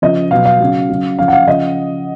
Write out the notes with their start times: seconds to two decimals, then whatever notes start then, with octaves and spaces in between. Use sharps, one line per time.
0.02 C#3 F3 D#5
0.31 B2 F#3 F5
0.45 F5
0.60 C#3 F#3
0.90 C#3 F#3
1.18 C#3 F3 F5
1.28 F#5
1.33 F5
1.47 C#3 F3 D#5